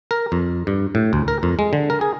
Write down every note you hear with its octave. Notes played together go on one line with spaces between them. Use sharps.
A#4
F2
G2
A2
D2
A#4
F2
G#3
D3
A#4
G#4